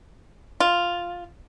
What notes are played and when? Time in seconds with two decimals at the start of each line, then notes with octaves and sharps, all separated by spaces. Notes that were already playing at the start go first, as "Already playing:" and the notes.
0.60 F4